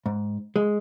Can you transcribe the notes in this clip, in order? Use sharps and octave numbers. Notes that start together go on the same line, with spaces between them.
G#2
G#3